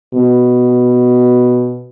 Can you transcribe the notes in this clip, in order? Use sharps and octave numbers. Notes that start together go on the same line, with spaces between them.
B2